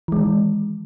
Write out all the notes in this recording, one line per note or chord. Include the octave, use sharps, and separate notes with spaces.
D#3 E3 G#3